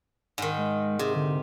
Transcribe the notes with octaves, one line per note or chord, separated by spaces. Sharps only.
G#2 D#3
G#3
C3 G#4
D3